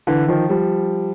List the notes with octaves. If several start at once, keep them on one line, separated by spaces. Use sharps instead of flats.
D3 E3
D#3 F3
F3 G3